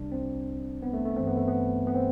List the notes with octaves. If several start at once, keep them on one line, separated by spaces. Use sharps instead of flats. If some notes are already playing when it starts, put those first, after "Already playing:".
Already playing: C2 C3 G3 D4
C4
B3
A3
A3
G2 E3 A3 C4
B3
A3
B3
B3
C4